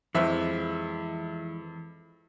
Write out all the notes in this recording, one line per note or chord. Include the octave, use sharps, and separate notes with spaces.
F2 E3 F3 G#3 E5